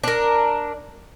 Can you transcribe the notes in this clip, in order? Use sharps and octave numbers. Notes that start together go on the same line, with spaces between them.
D4 A#4